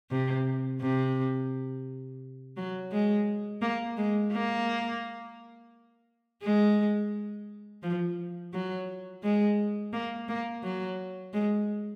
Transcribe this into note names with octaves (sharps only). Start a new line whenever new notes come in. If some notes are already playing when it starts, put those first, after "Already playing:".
C3
C3
F#3
G#3
A#3
G#3
A#3
G#3
F3
F#3
G#3
A#3
A#3
F#3
G#3